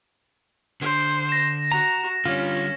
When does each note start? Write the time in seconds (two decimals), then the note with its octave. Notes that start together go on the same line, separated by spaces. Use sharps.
0.81 D3 C5
1.29 A#6 E7
1.72 F#4 A#5
2.26 D3 G3 C#4 F4